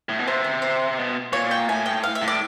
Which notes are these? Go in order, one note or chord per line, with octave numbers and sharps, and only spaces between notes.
A2
B2
C3 C5
C5
C5
B2
A#2 C#5
G5
A2 G#5
G5
F5
E5
A2
D5